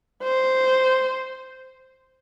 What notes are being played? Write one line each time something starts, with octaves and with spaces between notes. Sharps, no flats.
C5